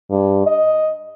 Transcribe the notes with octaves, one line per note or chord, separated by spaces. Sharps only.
G2
D#5